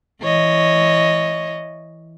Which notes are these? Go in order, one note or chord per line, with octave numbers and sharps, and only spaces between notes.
E3 C#5 D#5